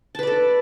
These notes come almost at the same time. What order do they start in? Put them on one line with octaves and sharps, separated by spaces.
A5 B4 D5 A4